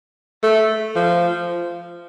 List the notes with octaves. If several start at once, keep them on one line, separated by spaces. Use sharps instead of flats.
A3
F3